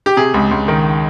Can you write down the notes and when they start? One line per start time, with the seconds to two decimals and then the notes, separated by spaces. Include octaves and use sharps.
0.06 G4
0.17 C3 G#4
0.34 C#2
0.51 C#2
0.68 D#3